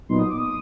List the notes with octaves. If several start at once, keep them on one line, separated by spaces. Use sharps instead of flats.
A#2 F#3 B3 D#4 C6
D#6
D6
D#6